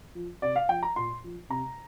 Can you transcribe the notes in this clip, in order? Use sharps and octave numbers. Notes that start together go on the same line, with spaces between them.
F3
C3 D5
F5
F3 G5
A#5
A#2 C6
F3
C3 A#5